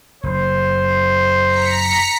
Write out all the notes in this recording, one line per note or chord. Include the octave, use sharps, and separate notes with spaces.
F#1 C5
A#5 B6 C#7